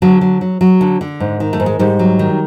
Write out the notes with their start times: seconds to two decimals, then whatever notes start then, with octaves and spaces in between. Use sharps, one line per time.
0.02 D3 F#3
0.21 F#3
0.41 F#3
0.61 F#3
0.81 D3
1.01 D3
1.20 G#2
1.40 D#3
1.53 A3
1.60 G#2
1.66 G#3
1.79 G#2 G3
1.99 F#3
2.19 D#3